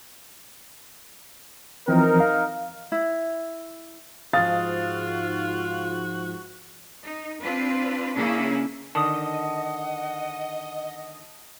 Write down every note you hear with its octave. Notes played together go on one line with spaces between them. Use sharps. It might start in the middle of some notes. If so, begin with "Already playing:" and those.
E3 F3 C4 D#4 A#4
F5
E4
G#2 F3 F4 F#4 F5 D#6 A6
D#4
C4 D4 F4 B4
C#3 A#3 C#4 D4 E4 G#4
D3 D#3 D#5 F#5 A5 D#6